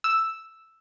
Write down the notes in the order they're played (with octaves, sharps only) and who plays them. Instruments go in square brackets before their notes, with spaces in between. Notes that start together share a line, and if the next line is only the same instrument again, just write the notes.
[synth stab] E6